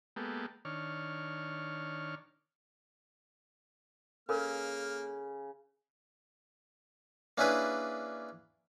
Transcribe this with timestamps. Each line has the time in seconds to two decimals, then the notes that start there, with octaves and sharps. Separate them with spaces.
0.16 G#3 A#3 B3 G4 A4
0.65 D#3 D4 C#5 F6
4.29 C#3 A#3 A4 A#4 F6
7.38 A#3 C#4 D4 E4 G#4 B4